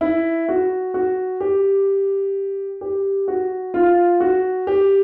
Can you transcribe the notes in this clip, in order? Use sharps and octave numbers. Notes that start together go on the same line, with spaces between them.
E4
F#4
F#4
G4
G4
F#4
F4
F#4
G4